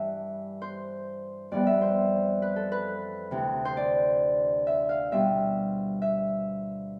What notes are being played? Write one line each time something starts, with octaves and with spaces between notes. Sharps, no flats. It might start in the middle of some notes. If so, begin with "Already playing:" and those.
Already playing: G2 E3 E5
C5
F2 E3 G3 B3 D5
E5
C5
B4
A4
B4
D2 C3 E3
C5
D5
E5
F5
B2 G3 C4 F4 E5
E5